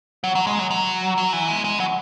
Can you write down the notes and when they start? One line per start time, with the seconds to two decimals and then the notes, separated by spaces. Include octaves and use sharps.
0.24 F#3
0.35 F#3
0.47 G#3
0.59 F#3
0.71 F#3
1.18 F#3
1.33 E3
1.48 G#3
1.64 G#3
1.80 F#3